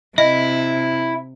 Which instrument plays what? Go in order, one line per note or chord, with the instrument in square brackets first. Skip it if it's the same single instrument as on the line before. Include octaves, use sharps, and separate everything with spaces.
[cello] C3 [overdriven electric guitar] E4 [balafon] D#5